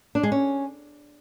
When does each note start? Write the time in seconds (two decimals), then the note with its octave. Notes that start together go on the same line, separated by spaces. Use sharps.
0.15 D4
0.23 G#3
0.32 C#4